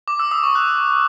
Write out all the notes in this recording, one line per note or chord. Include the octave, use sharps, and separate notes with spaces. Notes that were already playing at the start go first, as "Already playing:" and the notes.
D6
E6
D#6
C#6
F#6